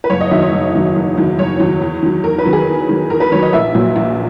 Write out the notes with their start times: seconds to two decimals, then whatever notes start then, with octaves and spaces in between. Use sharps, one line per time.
0.04 B4
0.10 F#1 C#5
0.21 D#5
0.31 E2 D#3 F#3 E5
0.42 C#5
0.53 F#1
0.74 E2 D#3 F#3
0.96 F#1
1.17 E2 D#3 F#3
1.39 F#1 C#5
1.60 E2 D#3 F#3
1.82 E2
2.03 D#3 F#3
2.24 E2 A#4
2.39 B4
2.45 D#3 F#3
2.53 G#4
2.67 E2
2.89 D#3 F#3
3.10 E2 A#4
3.20 B4
3.32 D#3 F#3 C#5
3.42 D#5
3.53 A#1 E5
3.75 A#2 F#3
3.96 A#1